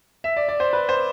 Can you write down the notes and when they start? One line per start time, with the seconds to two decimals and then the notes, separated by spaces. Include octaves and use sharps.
0.24 E5
0.37 D5
0.48 D5
0.60 C5
0.73 B4
0.89 C5